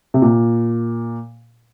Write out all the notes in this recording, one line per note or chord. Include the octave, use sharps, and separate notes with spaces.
C3
A#2